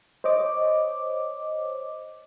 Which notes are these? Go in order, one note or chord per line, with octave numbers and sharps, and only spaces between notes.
C5 C#5 D#5 D6